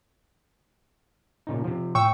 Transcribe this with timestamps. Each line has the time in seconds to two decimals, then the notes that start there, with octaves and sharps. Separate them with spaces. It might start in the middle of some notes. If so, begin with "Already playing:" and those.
1.47 A#2 C#3 D#4
1.64 C3 F3
1.95 A2 G5 C#6 E6